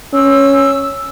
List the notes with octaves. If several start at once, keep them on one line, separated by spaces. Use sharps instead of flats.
C#4 E6